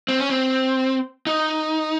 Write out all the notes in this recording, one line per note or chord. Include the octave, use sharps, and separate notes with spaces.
C4
C#4
C4
D#4